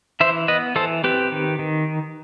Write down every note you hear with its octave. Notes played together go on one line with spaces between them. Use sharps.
E3 C5 E5
B3 B4 D#5
E3 A4 C5
C4 G4 B4
D#3
D#3